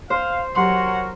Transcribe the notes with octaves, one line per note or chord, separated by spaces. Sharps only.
C5 F5
F#3 F#4 G4 A#4 C#5 F#5 C6